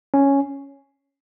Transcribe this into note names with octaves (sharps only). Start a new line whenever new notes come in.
C#4